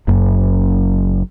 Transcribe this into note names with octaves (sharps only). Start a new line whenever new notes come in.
F#1 F#2